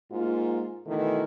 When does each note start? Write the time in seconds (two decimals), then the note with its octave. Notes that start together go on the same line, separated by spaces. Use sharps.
0.12 G#2 A#3 F4
0.86 B2 D#3 E3 A3